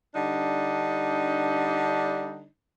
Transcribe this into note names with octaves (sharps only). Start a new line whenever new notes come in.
D3 G3 D4 D#4